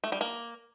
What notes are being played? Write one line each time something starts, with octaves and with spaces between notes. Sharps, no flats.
A3
G3
A#3